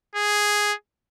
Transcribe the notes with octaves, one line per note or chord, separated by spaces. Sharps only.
G#4